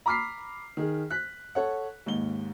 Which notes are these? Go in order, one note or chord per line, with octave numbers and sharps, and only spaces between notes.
A#5 B5 D6 F6 B6 C7
D#3 G#4
F#6 B6
A4 C#5 F#5
D#2 G#2 G7